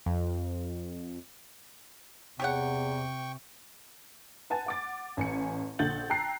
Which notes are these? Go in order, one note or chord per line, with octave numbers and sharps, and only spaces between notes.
F2
E2 C3 G4 C#5 F#5 G5 C#6
B4 F#5 G#5 A5 A6
F#5 D6 A6
A1 G#5 C#7
A#1 D3 F#5 G6 A6 F#7
G5 A5 A#5 E6 F#6 C7